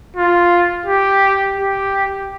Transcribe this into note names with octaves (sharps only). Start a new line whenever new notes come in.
F4
G4
G4